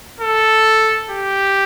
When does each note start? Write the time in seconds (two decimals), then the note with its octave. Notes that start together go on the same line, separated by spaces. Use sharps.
0.20 A4
1.11 G4